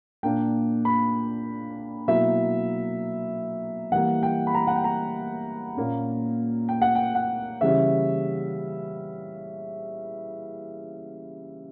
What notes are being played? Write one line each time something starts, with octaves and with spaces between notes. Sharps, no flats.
A#2 A#3 D4 G5
B5
B2 F#3 A#3 E4 E5
E3 G3 A#3 F#5
G5
B5
A#5
F#5
G5
A#5
A#2 A#3 C#4
G5
F#5
G5
F#5
C#3 E3 G3 C#4 E4 E5